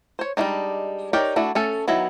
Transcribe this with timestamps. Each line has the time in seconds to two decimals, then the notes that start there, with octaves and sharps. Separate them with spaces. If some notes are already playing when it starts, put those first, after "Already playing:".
0.19 C5 C#5
0.37 G3 G#3 A#3 D4 D#4
1.13 D#4 G4 A#4 C#5 D5
1.36 A3 D4 E4 F#4
1.55 A3 C#4 A4
1.88 D#3 F#3 B3 E4